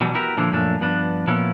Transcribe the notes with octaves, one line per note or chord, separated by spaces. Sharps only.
B2 E3 F#3 G3
B3 E4 F#4 G4 A#4
A#2 D3 F3 D4 E4
F#2 A#2 F3 A3 D4
G2 F3 B3 D4
A#2 F3 B3 C#4 E4